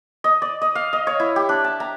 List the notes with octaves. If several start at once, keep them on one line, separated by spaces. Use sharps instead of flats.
D#5
D5
D#5
F5
D#5
C#5
E4
G4
D4
A5
A#5